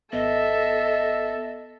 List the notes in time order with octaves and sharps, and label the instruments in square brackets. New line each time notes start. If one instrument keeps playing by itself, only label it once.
[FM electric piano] G#1 B3 [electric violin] A4 [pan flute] D#5 [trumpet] E5